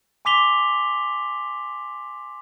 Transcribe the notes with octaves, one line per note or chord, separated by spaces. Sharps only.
G#5 C6 D6 B6 F7 G7